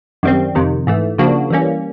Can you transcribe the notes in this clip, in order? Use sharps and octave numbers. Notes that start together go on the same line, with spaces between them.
F#2 D#3 G3 C4
F2 C3 D#3
G#2 E3 A3
C#3 F3 A#3 D4 F#4
E3 G3 A#3 C#4